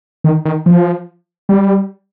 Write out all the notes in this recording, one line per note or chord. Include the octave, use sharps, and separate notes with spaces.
D#3
D#3
F3
G3